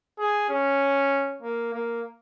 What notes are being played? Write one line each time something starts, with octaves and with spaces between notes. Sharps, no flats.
G#4
C#4
A#3
A#3